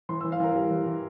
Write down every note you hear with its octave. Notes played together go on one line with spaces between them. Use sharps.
E3 C6
E3 E6
F5
E3 A#4
G3
E3
E3